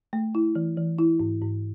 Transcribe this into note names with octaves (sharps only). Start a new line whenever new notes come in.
A3
E4
E3
E3
E4
G#2
G#2